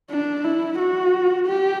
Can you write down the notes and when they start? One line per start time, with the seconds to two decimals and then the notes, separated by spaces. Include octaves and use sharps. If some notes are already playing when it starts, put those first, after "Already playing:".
0.10 D4
0.44 E4
0.78 F#4
1.47 G4